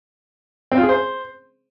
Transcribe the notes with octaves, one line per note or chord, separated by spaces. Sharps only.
C4
F4
G#4
C5